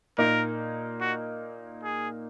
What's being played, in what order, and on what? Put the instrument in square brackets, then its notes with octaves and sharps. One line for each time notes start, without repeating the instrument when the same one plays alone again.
[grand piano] A#2 A#3 D#4 [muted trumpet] A#4
[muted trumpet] F#4
G#4